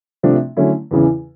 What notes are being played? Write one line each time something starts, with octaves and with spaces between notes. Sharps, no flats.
C3 F3 A3 D4
D3 F#3 A3 C#4 E4
E2 C#3 E3